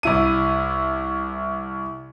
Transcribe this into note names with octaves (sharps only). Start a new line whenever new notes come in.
C2 E4 D#7